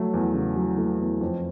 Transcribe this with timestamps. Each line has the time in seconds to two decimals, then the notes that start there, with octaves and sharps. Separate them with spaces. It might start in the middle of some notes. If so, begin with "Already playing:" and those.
Already playing: F#3 A3
0.14 E2
0.34 C#3
0.56 F#3
0.78 A3
1.00 E2
1.21 F2